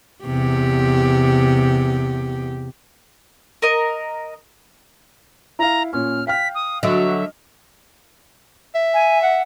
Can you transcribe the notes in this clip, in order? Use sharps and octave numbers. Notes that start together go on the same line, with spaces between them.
E2 C3 G4
A#4 D#5
E4 F5 A#5
A#2 C#4 F6
F5 G5 F6 B6
D#6
D3 F#3 D#5 E5
E5
G#5
F#5